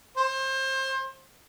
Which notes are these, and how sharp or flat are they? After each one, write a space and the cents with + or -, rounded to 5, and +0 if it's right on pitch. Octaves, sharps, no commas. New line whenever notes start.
C5 +25